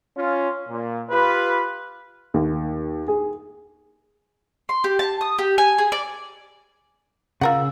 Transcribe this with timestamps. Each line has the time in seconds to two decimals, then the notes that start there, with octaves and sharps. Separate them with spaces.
0.17 C#4 F4
0.69 A#2
1.11 F4 G4 B4
2.34 D#2
3.08 G#4
4.69 C6
4.84 G4
4.99 A5
5.21 D#6
5.39 G4
5.58 G#5
5.78 G#4
5.92 D5
7.41 C#3 F4 A#4 F#5 E6